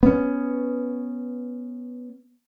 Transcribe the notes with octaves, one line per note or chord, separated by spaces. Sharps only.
B3 C#4